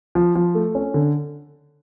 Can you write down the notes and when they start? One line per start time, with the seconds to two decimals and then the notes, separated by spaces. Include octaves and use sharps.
0.15 F3
0.35 F3
0.55 A3
0.75 C#4
0.94 D3